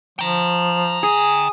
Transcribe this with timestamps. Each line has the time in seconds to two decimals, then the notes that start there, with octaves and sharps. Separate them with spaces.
0.19 F3 G5 A#5
1.03 G#4 D#6